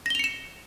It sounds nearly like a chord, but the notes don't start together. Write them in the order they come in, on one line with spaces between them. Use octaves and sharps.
A#6 G7 F7 C#7 E7